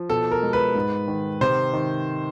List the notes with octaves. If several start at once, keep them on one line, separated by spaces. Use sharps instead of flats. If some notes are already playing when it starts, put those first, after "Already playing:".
Already playing: F3
B2 A4
A#4
G#3
B4
G#2
D#3
C3 C5
D#3